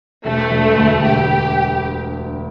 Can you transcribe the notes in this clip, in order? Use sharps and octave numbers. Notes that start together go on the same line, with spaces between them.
E1 A3
E1
D2
E1 G4